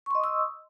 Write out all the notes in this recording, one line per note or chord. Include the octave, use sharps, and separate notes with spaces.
D#5 C6 C#6 D#6 E6